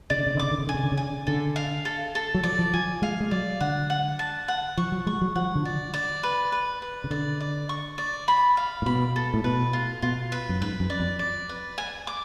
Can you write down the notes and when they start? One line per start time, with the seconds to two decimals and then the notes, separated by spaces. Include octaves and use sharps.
0.10 C#3 D5
0.18 D3
0.27 C#3
0.35 D3
0.39 C#3 D6
0.51 D3
0.58 C#3
0.67 D3 G#5
0.75 C#3
0.84 D3
0.92 C#3
0.97 G#5
1.27 D3 A4
1.56 F5
1.85 A4
2.15 A4
2.34 F#3
2.43 F3 D5
2.59 F3
2.74 F3 G#5
3.02 G#3 F5
3.20 G#3
3.31 F#3 D5
3.60 D3 F#5
3.90 F#5
4.19 A5
4.48 F#5
4.77 F3 C#6
4.92 F#3
5.07 G#3 C#6
5.22 F#3
5.35 F3 F#5
5.55 D3
5.65 D5
5.94 D5
6.23 B4
6.52 B4
6.82 B4
7.04 C#3
7.11 D3 D5
7.40 D5
7.69 C#6
7.98 D5
8.28 B5
8.57 F5
8.82 A2
8.86 B2 B5
9.16 A4
9.34 A2
9.44 B2 B4
9.73 F4
10.02 B2 F4
10.32 B4
10.49 F#2
10.61 G#2 B4
10.80 F#2
10.90 D5
11.00 F2
11.19 D5
11.49 B4
11.78 G#5
12.07 D6